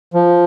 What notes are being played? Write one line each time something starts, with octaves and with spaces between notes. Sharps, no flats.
F3